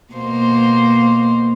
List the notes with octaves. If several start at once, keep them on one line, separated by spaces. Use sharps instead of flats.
B2 A#3 C5